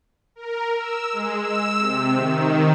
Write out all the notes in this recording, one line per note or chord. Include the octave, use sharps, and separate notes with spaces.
A#4
E6
G#3
E6
C3
D#3